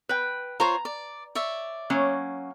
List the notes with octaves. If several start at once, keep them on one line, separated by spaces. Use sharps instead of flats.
B4 G5
F4 C5 C#5 A#5
D5
C#5 D5 E5
F#3 A#3 C#4